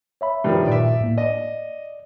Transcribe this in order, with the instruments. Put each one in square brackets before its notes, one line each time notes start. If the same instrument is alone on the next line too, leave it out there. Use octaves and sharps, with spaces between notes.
[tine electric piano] C#5 E5 B5
[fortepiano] G2 D#3 F3
[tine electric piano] A#2 [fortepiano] D5 E5
[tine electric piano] A2 A#3
[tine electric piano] D5 [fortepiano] D#5